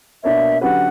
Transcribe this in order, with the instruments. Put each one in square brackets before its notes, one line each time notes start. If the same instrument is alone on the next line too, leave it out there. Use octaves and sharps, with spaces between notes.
[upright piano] B2 A#3 D4 A#4 C#5 [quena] E5
[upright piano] D3 F#3 C#4 G4 B4 [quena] F#5